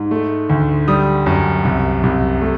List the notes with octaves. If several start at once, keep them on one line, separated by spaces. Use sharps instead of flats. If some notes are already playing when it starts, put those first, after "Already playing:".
Already playing: G#2
A3
D2
G3 D#6
F#2
C2
C2
A3